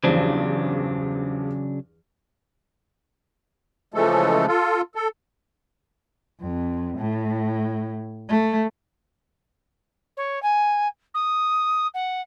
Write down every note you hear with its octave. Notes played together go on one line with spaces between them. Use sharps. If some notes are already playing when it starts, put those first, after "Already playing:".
E2 G2 C#3 F3 F#3 D4
C#3 E3 F3 G#3 A3 A4
F4 A4
A4
F2
A2
A3
C#5
G#5
D#6
F#5